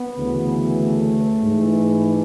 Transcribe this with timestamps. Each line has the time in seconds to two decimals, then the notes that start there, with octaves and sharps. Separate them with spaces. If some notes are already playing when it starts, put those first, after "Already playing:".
Already playing: B3
0.14 D2 C#3 E3
0.78 A3
1.44 G#2 E3